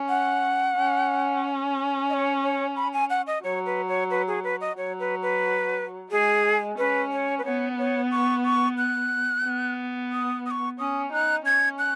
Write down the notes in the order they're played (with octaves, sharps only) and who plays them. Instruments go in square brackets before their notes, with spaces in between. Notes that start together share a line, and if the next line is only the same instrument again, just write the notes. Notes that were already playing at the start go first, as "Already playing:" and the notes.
Already playing: [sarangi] C#4
[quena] F#5
[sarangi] C#4
[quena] D#5
C#5
C#5
B5
G#5
F#5
D#5
[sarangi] F#3 [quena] C#5
[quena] B4
C#5
B4
G#4
B4
D#5
[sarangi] F#3 [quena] C#5
[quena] B4
B4
[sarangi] G#3 [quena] G#4
[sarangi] C#4 [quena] B4
[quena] C#5
B4
[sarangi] B3 [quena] C#5
[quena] C#5
C#6
C#6
F#6
[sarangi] B3
[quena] D#6
D#6
C#6
[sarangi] C#4 [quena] D#6
[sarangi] D#4 [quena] F#6
[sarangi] C#4 [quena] G#6
[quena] F#6